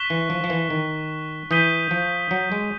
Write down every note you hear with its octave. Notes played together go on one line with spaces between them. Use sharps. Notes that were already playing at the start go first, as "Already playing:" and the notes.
Already playing: C#6 F#6 B6 E7 G7
E3
F3
F3
E3
D#3
E3 D#6 G6 B6 D#7 G7
F3
F#3
G#3